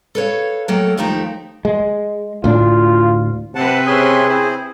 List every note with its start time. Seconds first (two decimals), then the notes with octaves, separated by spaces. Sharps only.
0.15 A4 B4 C#5 F5
0.68 F#3 A3 A#3 A4 G5
0.97 D#2 F3 A3 D#4 G4 A#5
1.65 G#3
2.44 D2 A2 D4 F4
3.55 C3 C4 B4 F#5 A5
3.86 C#4 G#4 E5 C6
4.28 C4 E4 C5